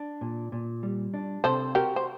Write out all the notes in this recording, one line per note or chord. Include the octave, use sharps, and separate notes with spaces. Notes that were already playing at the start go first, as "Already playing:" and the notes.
Already playing: D4
A#2
A#2
G3
D4
C3 A4 C5
F#4 G4 A#4
C5